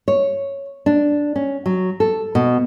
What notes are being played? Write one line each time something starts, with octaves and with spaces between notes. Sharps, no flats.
C#5
D4
C#4
F#3
A4
B2